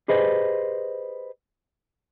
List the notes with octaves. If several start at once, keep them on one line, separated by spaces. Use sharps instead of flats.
G4 G#4 B4 C5 D#5